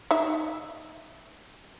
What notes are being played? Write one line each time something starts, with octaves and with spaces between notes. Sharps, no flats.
D#4 E5